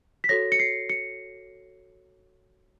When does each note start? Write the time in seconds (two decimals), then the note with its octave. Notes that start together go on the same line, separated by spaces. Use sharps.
0.24 B6
0.29 F#4 A4 C#5 A#6
0.52 C#7
0.59 C7
0.90 C#7